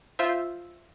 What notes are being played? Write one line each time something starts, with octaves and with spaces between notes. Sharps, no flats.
F4 C5 E5